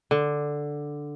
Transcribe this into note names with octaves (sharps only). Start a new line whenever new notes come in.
D3